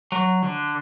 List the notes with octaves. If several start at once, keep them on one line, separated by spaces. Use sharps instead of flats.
F#3
D3